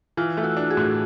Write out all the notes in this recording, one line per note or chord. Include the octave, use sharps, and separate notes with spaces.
E3 F4
A3
E4 F#4
D4
F#4 G#4
A2